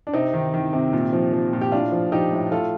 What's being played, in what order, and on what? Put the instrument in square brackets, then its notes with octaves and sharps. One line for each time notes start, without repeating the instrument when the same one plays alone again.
[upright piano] D4
C3 C4 D#4
D#3
D#3
C3
A#2
F3
F3
A#2
G4
A2 D4 F4
F3
F3 D#4 G4
A2
A2 F4 A4